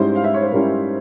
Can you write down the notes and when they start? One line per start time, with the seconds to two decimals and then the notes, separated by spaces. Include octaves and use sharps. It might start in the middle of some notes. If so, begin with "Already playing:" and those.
Already playing: G#2 G3 C#4 E4 C5
0.15 F5
0.24 E5
0.34 C#5
0.42 C5
0.52 G#2 G3 C#4 E4 A#4